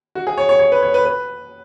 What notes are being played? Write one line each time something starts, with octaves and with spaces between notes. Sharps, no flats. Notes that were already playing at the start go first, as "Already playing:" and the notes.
F#4
G#4
C#5
C#5
C#5
B4
C#5
B4
B4